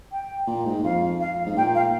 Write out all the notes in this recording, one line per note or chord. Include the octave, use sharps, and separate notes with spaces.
G5
A#2
G#2
F2 F5
F5
G#2
A#2 G5
F5